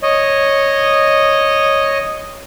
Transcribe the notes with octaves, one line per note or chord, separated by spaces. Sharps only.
C#5 D#5